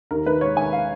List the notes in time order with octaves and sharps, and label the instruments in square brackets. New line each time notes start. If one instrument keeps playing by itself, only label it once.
[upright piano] D#2 A#4
D#3 B4
G#3 C#5
D#2 G#5
F5